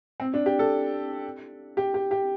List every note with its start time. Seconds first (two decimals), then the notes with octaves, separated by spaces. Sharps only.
0.20 C4
0.34 D4
0.46 G4
0.59 A4
1.77 G4
1.94 G4
2.11 G4